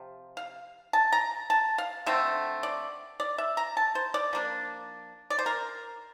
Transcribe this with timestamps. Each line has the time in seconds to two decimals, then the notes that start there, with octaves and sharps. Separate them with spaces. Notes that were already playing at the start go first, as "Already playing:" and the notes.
Already playing: C3 F3
0.37 F5
0.93 A5
1.12 A#5
1.50 A5
1.78 F5
2.06 D3 A3 C4 E5
2.63 D5
3.20 D5
3.38 E5
3.57 A#5
3.77 A5
3.95 C5
4.14 D5
4.33 F3 A#3 D4
5.30 D5
5.39 C5
5.46 A#4